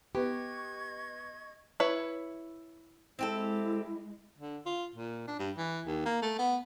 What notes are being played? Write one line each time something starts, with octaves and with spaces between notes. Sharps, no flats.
B3 G4 D#5 C#6 G#6
E4 B4 C#5
G#3 C4 E4 G4 A4
D3
F4
A#2
D4
G2
E3
D#2
A#3
A3
B3